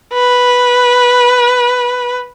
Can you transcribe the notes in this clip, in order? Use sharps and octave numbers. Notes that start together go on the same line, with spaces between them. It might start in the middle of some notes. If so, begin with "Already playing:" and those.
B4